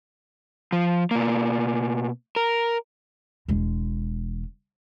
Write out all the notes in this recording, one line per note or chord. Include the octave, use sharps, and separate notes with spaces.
F3
B2 A#3
A#4
E1 G#3